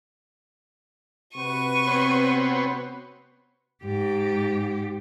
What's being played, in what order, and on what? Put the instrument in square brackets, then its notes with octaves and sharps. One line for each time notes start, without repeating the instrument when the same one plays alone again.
[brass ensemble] C3 F#4 B4 [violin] C#6 D#7
[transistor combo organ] B3 C4 C#5
[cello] G#2 G4